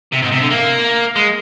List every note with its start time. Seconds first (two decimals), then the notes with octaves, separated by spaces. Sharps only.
0.12 C3
0.22 G#2
0.31 C3
0.40 D3
0.50 A#3
1.16 G#3